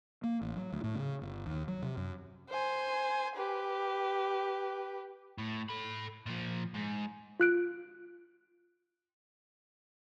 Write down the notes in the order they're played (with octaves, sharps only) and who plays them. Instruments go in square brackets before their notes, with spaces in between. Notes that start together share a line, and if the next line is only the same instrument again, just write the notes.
[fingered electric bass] A#3
A1
F#3
D2
A2
C#3
G1
D#2
F#3
C3
F#2
[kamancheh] C5 G#5
G4 B4
[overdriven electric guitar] A2
A4 B5
A#2 F3
G#2
[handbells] F4 F#6 D7